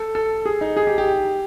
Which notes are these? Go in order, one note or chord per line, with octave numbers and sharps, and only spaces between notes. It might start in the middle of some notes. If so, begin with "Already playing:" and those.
Already playing: A4
A4
G#4
D#4
G#4
G4
G4